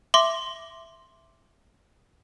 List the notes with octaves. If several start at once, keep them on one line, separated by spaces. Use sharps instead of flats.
E5 C6 D6